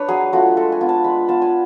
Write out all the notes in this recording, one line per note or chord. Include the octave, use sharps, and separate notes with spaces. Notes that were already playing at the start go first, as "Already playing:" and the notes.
Already playing: D4 B4 C#5
F#3 G#4
A3 D4 F4 F#4
G#3 A4
G#5
B3 F4
A5
G#3 B5
B3 F4 A5
G#5